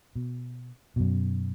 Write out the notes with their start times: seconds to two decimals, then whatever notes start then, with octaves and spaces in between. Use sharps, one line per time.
0.15 B2
0.96 F#2 B2